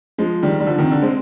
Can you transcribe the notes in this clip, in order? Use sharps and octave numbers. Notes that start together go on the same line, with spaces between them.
F3 G#3
D#3 G3
G3
D3 F3
C3 D#3
D3
G#3 C4